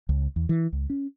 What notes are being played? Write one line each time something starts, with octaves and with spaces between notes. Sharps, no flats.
C#2
E2
E3
C#2
C#4